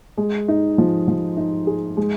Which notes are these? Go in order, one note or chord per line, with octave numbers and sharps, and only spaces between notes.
G#3
D#4
F3
F3
D#4
G#4
G#3